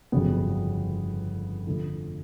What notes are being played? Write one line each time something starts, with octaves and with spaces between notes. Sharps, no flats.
G1 F2 C#3 F#3 B3
F2 D3 F3 A3